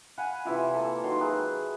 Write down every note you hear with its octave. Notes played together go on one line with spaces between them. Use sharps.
F5 F#5 G#5 B5
C3 E3 E4 F4
A#3 A4
D#3 F#3 A#5 C6
G#4 B4 E5